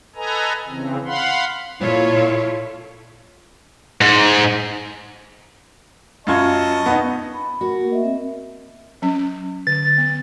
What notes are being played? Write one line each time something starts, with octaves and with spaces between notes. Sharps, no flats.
A4 B4 D#5 G#5 A#5
C#3 E3 C4
F5 F#5 B5 C6
A#2 E4 F4 A4 C#5
G#2
F#2 F4 D#5 A5 C#6 G#6
B3 D#4
B5
A3 F#4 A#4
A#3 A#4
D#5 E5
C4
F#3 C#4
D3 A6
B3